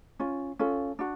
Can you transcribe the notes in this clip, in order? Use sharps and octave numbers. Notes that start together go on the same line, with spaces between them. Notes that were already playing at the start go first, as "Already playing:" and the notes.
C#4 F4
C#4 F4 A4
D4 F#4